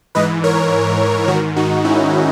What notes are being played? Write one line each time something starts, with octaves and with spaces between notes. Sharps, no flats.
G#2 E3 B4 D#5
A#4 C#5
G#2 D#3 F#4 A#4
D#4 F#4
C#4 E4